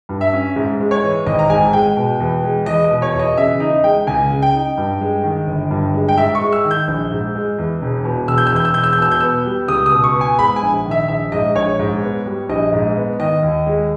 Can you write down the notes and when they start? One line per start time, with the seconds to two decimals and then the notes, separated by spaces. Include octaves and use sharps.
0.09 G2
0.21 E5
0.33 C#4
0.56 G#2
0.80 G#3
0.91 C#5
1.03 E3
1.26 G#1 D#5
1.39 A#5
1.50 G#2 G#5
1.73 G#3 G5
1.97 B2
2.20 E2
2.43 G#3
2.66 E2 D#5
2.84 D#5
2.90 B2
3.02 C#5
3.13 E2
3.19 D#5
3.37 C#3 E5
3.60 D#4 D#5
3.84 G#3 G5
4.07 C#2 G#5
4.30 C#3
4.42 G5
4.54 D#4
4.77 G2
5.01 G#3
5.24 D#3
5.47 G1
5.71 G2
5.94 G#3
6.09 G5
6.17 G#2 E5
6.35 C#6
6.41 G#3
6.52 E6
6.64 D#3
6.71 G6
6.88 A#1
7.11 G#2
7.35 G#3
7.58 E2
7.82 E1
8.05 B2
8.28 E1 E6
8.38 G6
8.47 E6
8.51 E2 G6
8.65 E6
8.74 E1 G6
8.84 E6
8.93 G6
8.98 B2 E6
9.12 G6
9.20 B3 E6
9.45 G3
9.68 C#2 D#6
9.86 D#6
9.92 B2
10.04 C#6
10.15 B3
10.21 G#5
10.39 G#2 B5
10.56 G#5
10.63 A#1
10.86 D#3
10.91 E5
11.08 A#1 E5
11.32 G#2 D#5
11.55 A#1 C#5
11.79 G#2
12.02 B3
12.26 G3
12.49 A#1 D#5
12.73 G#2
12.96 B3
13.20 D#3 D#5
13.43 D#2
13.66 G#3